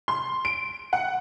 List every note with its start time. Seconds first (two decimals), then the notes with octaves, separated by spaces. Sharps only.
0.08 C6
0.45 D7
0.93 F#5